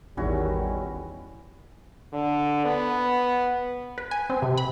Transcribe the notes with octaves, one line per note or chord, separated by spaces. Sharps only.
A1 E2 D#3 G3 C#4 E4 F#4
D3
B3
B4
G#5
C4
C3
B5